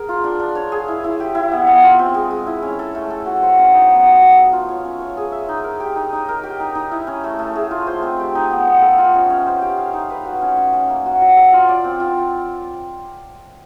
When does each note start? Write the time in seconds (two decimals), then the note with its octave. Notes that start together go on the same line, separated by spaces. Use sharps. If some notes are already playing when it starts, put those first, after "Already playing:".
Already playing: G#4 A#4
0.09 F4
0.24 D4
0.39 D4
0.55 C#5
0.72 G#4
0.88 E4
1.04 E4
1.20 G4
1.35 E4
1.52 B3
1.67 B3
1.83 F4
1.99 C4
2.14 G#3
2.31 G#3
2.47 E4
2.62 C#4
2.79 A4
2.95 A3
3.11 A4
3.26 F#4
3.42 C5
3.58 C#4
3.73 D#4
3.90 B3
4.06 F#3
4.22 F#3
4.38 A4
4.53 F4
4.69 C#5
4.85 C#4
5.00 C#5
5.17 G#4
5.32 E5
5.49 D#4
5.64 A#4
5.80 G4
5.96 D#4
6.13 D#4
6.29 A#4
6.43 G4
6.60 D#4
6.75 D#4
6.91 E4
7.07 C#4
7.24 A3
7.39 A3
7.55 G#4
7.71 F4
7.87 C5
8.02 C4
8.20 G4
8.35 D#4
8.51 B3
8.67 B3
8.82 A4
8.98 F4
9.15 C#4
9.30 C#4
9.47 C5
9.61 G4
9.78 F5
9.93 D#4
10.10 B4
10.25 F#4
10.42 C#4
10.57 C#4
10.73 C#4
10.89 A#3
11.06 F#4
11.22 F#3
11.37 A4
11.53 F4
11.69 D5
11.84 C4
12.00 F4